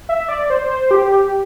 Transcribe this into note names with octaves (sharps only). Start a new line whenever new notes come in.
E5
D5
C5
C5
G4
G4